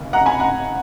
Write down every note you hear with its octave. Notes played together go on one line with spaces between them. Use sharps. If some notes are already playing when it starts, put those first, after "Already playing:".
Already playing: F1 D#2 C#3
F#5 A#5
G#5 B5
F#5 A#5